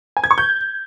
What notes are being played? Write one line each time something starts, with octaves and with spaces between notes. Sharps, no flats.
G#5
G#6
C#6
G6